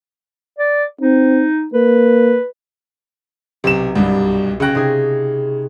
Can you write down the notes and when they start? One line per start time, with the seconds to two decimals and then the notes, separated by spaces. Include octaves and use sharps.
0.59 D5
1.01 C4 D#4
1.74 A#3 B4
3.64 B1 C3 E7
3.95 C2 G2
4.60 C#3 C#4 G5 F#6 A#6
4.75 C3 D#4 G#4